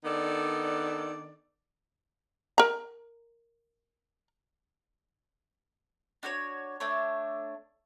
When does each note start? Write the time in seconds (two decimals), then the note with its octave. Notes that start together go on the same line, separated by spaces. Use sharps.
0.05 D#3 B3 D4 A4 D5
2.58 A#4 A#5
6.23 D4 F#4 C5 C#5
6.80 A3 D4 C#5